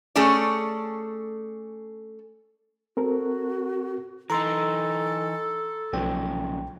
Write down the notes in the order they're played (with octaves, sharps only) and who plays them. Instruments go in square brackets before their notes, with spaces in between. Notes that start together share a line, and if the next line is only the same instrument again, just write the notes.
[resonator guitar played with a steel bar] A3 C#4 G#4 A4 D5
[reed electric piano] C4 A4 A#4 [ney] F#4
[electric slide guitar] E3 D#4 [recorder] A4 [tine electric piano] A#5 C6
[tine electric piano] B1 G5 [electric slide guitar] A#2 C#3 F3